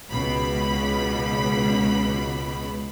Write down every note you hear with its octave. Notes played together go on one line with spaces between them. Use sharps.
C#2 B2 B5